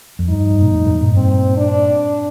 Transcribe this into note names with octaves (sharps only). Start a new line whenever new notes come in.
F2
G2 D#4
G2
A#2
F2 A2
F2 A2
G2 A#2
C4
D4